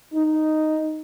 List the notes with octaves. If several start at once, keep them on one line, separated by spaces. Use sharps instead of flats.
D#4